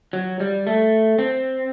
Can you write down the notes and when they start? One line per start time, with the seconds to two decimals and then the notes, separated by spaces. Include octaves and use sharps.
0.13 F#3
0.40 G3
0.67 A3
1.19 C4